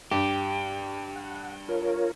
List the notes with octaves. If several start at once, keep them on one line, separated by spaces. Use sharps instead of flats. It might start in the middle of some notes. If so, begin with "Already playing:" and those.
G2 G4
F#5
F4 A#4 C#5